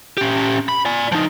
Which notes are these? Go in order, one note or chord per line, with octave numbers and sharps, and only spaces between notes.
C#4 G4
B5
D5 G#5
F3 D#4